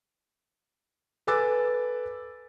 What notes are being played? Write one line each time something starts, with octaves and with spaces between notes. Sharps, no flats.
A4 B4 G#5 D6 E6 A6